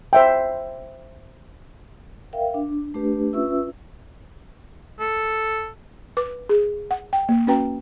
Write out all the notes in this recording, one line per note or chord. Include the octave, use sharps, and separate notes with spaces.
C5 E5 G5
A#4 E5 F5 G5
D4
A3 D4 G4 B4
C#4 F4 B4 E5 E6
A4
B4 D6
G#4
F#5
G5
A#3
C#4 F#4 B4 G5 A#5